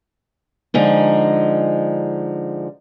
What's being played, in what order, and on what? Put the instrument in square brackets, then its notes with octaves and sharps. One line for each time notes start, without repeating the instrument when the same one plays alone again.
[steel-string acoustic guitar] D3 F3 G#3 D#4